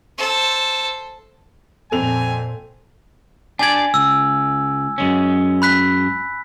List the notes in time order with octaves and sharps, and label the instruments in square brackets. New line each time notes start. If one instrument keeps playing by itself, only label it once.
[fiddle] A4 C5
[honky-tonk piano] F2 F7 [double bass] A#2 C4 [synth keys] A4 [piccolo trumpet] G#5
[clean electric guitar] D4 G4 D5 [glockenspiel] G#5 G#6
[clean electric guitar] C#2 [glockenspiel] E6
[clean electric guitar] F#2 G#3 C#4
[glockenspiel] B5 F#6 B6